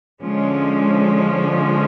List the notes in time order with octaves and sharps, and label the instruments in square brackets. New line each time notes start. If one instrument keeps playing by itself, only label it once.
[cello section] D3 F3 G#3 C#4